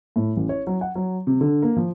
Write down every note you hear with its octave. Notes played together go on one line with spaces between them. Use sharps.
A2
A1
C#5
F#3
F#5
F#3
C3
D3
A#3
F3